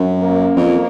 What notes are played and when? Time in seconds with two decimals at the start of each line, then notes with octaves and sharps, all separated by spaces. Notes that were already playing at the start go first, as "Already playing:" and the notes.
Already playing: F#2
0.22 A#3
0.56 F2